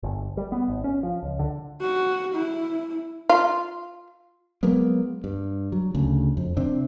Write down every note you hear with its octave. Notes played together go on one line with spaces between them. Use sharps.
G1
G3
B3
G#1
C#4
F3
C#2
D3
F#4
E4
F4
F#3 G#3 A#3 B3
G2
F#3
D2 C#3
F2
C3 C4 D4